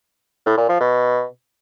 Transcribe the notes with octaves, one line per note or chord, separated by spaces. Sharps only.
A2
A#2
F3
B2